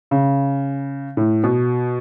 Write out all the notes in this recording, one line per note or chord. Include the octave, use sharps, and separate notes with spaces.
C#3
A2
B2